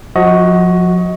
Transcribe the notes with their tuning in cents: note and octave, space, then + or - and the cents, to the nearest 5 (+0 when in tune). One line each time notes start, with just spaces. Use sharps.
F3 +35 F#4 +0 D#5 +25